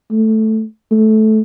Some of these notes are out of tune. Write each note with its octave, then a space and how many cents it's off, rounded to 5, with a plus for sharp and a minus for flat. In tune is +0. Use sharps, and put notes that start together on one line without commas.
A3 +0
A3 -15